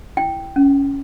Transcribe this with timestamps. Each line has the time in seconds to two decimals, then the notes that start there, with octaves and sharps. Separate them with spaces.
0.17 E4 G5
0.56 C#4